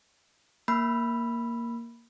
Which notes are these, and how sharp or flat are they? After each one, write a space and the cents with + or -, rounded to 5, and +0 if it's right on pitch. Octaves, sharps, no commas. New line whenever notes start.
A#3 +0 B5 -5 E6 +40